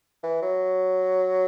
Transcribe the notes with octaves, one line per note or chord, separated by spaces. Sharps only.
E3
F#3